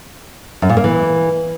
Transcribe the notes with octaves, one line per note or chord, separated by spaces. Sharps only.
F#2
A#2
A#3
E3